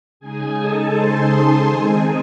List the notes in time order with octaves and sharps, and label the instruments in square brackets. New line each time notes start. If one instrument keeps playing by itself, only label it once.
[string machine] C#3 G#3 D#4 G#4 G#5
A4 A5
C5 C6
D#3 G#3 C4 D#4 G#4 G#5